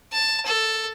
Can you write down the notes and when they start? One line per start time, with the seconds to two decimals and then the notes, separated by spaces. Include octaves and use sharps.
0.12 A5
0.46 A4